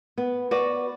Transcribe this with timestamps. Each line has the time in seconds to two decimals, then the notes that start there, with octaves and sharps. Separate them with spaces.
0.18 B3
0.51 F#4 B4 D5